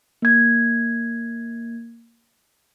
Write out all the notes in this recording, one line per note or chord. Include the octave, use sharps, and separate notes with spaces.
A#3 G#6